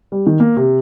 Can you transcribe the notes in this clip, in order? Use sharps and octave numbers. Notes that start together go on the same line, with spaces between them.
G3
D#3
A#3
C3